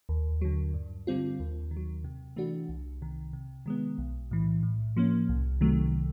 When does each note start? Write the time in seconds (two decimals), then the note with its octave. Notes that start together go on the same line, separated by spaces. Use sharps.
0.09 D#2
0.41 D3 F#3
0.74 G2
1.07 D3 G3 C4 F4
1.40 D#2
1.71 D#3
1.77 F#3
2.04 C3
2.36 E3 A3 D4 F#4
2.69 C2
3.02 C3 D#3
3.33 C3
3.66 D#3 G#3 B3
3.98 B1
4.31 A2 E3
4.63 A2
4.96 F3 A#3 C#4
5.29 C2
5.61 C3 D#3 F#3 A3